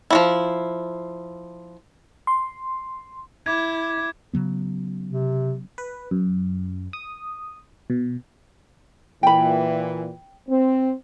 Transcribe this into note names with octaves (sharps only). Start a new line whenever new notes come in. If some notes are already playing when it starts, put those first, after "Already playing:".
F3 F#3 E4
C6
E4 D6 G#6
C#3 F#3 B3
C3
B4
F#2
D#6
B2
A#2 E3 G5 B5
C4